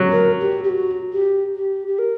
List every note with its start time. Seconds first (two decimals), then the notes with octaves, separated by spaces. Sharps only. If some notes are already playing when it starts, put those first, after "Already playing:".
Already playing: F#3
0.12 A#4
0.41 G4
0.64 G4
0.69 F#4
1.13 G4
1.56 G4
1.88 G4
1.99 A#4